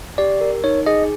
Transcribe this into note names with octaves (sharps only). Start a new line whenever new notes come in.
G4 D5
A#4
D#4 C#5
G#4 D#5